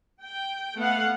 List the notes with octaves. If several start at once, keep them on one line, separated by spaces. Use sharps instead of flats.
G5
A3 B3 F5 F#5